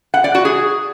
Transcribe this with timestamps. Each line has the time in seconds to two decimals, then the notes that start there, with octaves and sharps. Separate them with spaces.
0.14 F#5
0.24 D5
0.35 F#4
0.45 G#4